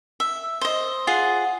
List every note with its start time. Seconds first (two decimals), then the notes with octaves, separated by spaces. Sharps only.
0.20 E5
0.61 C5 D#5
1.07 F4 G#4 F#5